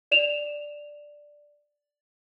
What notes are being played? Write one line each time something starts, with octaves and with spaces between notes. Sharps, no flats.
D5 E7 F7